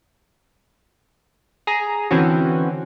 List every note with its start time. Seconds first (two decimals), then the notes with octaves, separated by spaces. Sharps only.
1.67 G#4 A#5
2.11 D3 E3 C4 C#4 F#4